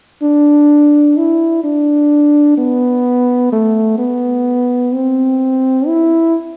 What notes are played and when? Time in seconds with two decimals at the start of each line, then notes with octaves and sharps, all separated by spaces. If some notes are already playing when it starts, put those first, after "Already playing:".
0.22 D4
1.17 E4
1.64 D4
2.58 B3
3.52 A3
3.99 B3
4.94 C4
5.87 E4